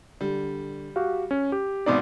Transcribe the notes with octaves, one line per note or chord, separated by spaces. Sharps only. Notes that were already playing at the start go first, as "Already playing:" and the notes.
D3 G3
F#4 G4 F5
C#4
G4
G#1 B2 D#4 D5 D6